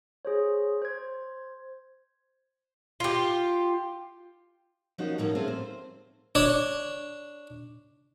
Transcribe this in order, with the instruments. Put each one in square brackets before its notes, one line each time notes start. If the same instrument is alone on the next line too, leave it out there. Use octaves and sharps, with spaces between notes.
[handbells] G#4 C5 C#5
C5 G#6
[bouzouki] F4 G4
[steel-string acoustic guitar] F3 A#3 C#4 D#4 F#4 C#5
A2 F3 A#3 D#4 F#4
A3 A#3 C4 C#4 G#4 C5
C5
[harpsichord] D4 C#5